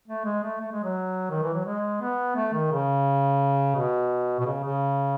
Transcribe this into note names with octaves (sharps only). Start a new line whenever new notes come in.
A3
G#3
A3
A3
G#3
F#3
D#3
E3
F#3
G#3
B3
A3
D#3
C#3
B2
B2
C#3
C#3